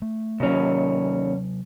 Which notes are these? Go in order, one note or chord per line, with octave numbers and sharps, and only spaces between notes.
A3
D#2 C3 F#3 C#4